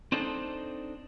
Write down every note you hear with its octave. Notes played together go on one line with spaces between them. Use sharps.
C4 D4 D#4 A4 B4 C5